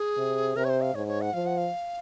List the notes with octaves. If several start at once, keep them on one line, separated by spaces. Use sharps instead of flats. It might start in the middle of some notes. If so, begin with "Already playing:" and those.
Already playing: G#4
C3
C3 A#4
C#5
C5
F5
G#2 C#5
C#5
F#5
F3 F5
F#5
F5